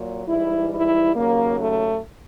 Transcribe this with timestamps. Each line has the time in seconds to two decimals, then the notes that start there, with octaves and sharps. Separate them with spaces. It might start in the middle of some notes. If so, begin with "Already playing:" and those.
Already playing: A#2 F#3
0.27 G#2 E3 G3 E4
0.71 E4
1.14 D#2 C#3 F#3 A#3
1.57 A3